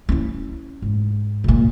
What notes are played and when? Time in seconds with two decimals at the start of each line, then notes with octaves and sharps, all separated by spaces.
0.09 C#4 E4
0.82 G#2
1.44 C#2 A#2